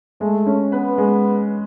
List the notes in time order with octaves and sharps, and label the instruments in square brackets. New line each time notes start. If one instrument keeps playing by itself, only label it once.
[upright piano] G#3 [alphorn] A3
[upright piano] C#4
[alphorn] B3 [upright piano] B4
[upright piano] G#3